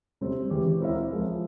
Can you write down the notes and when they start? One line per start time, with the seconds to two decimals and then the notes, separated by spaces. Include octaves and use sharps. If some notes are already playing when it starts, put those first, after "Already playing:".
0.21 C3 G3 C4
0.50 E3 G#3 C#4 G4 C#5
0.80 C4 E4 A#4 C#5 E5
1.10 F3 G#3 C#4